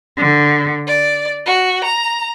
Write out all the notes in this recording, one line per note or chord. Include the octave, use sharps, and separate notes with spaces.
D3
D5
F#4
A#5